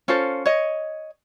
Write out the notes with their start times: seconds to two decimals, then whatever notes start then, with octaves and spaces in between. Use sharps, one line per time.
0.08 C#4 F4 A4 C5
0.46 C#5 D#5